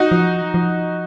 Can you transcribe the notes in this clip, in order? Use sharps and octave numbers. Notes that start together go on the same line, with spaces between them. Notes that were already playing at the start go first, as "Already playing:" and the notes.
Already playing: D#4 F#4
F3
F3